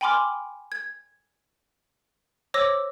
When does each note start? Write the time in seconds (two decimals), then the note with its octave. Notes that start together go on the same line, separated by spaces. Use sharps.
0.01 G5 G#5 B5 C6 D6 F6
0.72 G#6
2.54 C5 C#5 D6 E6 A#6